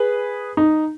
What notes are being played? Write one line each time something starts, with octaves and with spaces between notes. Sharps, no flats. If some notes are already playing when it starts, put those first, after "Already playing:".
Already playing: G#4 B4
D#4